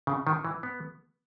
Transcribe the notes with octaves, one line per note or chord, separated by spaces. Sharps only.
C#3
D#3
E3
B3